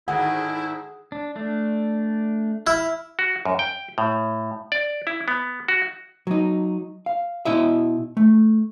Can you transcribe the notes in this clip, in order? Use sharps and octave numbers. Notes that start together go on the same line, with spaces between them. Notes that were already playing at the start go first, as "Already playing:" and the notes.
G#2 D3 D#3 E4 G#4 F#5
D4
A3 D4
E4 F6
F#4
F#2
G5
A2
D5
E4
B3
F#4
F#3 D#4
F5
B2 E4 D#5 E5
A3